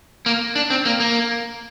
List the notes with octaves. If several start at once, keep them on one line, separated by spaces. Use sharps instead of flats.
A#3
D4
C4
A#3
A#3